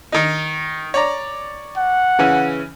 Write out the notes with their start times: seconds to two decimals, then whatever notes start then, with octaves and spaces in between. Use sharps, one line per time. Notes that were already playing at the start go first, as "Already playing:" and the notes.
0.12 D#3 D#4
0.94 C#5 D5 A#5
1.77 F#5
2.19 C#3 E3 C#4